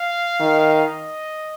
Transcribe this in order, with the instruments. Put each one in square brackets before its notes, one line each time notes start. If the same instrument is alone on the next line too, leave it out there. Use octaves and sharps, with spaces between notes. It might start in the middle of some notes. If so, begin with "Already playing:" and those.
Already playing: [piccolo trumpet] F5
[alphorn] D#3
[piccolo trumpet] D#5